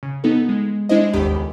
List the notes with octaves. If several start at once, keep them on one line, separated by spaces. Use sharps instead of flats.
C#3
B3 D#4 A4
G#3
G#3 D4 E4 C5 D#5
G1 D#2 D#3 G4 B5
C#2